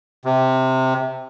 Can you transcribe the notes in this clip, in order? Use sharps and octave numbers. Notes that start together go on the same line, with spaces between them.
C3